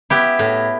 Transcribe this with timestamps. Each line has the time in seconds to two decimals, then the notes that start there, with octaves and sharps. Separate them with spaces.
0.10 B3 E4 G4
0.39 A2